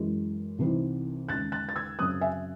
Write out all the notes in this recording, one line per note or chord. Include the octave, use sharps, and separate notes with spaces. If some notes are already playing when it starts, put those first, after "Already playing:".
Already playing: F#2 E3 G#3
C2 C3 E3 C4 D#4
D#2 C#3 G#3 C#4 F#6 A6
F#6 A6
A6
E6 G#6
F#2 C#3 F#3 C4 D#6 F#6
E5 G#5